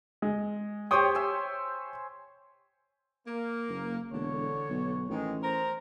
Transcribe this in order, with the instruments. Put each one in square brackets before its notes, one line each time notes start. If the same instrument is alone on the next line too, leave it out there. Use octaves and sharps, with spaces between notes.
[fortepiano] G#3
[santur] G4 C5 C#5 [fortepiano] G5 D#6
[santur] E5 G#5
[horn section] A#3
[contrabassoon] F#1
[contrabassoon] E1 [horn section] D3 C#5
[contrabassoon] B1
[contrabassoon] A1 [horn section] D#3 G#3
[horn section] A#4 C5 A#5